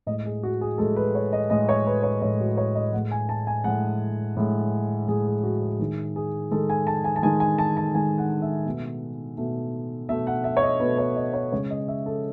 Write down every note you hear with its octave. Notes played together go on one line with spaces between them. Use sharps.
A2 G#3 D#5
G#4
F#4
G#4
A2 G#3 A4
B4
C#5
D#5
A2 G#3 D#5
C#5
B4
C#5
A2 G#3 C#5
F#4
C#5
D#5
A2 G#3 F#5
G#5
A5
G#5
A2 G#3 F#5
A2 G#3
A2 G#3 G#4
G#4
F#4
G#4
D#3 G#3 G#4
G#4
D#3 G#3 A4
G#5
A5
G#5
A5
D#3 G#3 G#5
G#5
A5
A5
D#3 G#3 G#5
F#5
E5
B2 A3 E5
B2 A3
B2 A3 E5
F#5
E5
C#5
D#5
B2 A3 B4
C#5
D#5
C#5
C#3 G#3 C#5
D#5
E5
A4